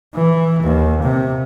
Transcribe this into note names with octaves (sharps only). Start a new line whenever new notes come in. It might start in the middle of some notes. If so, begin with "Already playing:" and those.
E3
D#2
C3